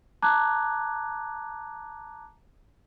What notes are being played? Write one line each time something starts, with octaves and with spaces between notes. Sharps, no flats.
A5 A#5 D6 F#6 G#6